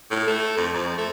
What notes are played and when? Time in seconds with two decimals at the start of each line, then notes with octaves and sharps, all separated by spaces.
0.11 A2
0.27 A3
0.57 F2
0.73 F2
0.98 A3